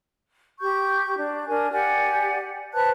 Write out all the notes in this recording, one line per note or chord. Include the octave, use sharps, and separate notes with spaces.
G4 C#6 G6
D4
D4 A#4 G#5
G4 D5 F#5 G#5
B4 C5 A5 F#6